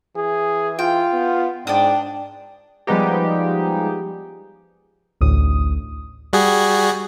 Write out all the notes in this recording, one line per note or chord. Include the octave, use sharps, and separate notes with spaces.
E3 G#4
F4 G5
B3
G#2 D4 D5 G5 D#6
F3 G3 G#3 B3 D#4 G4
A1 D2 A2 D#6
G3 F#4 G#4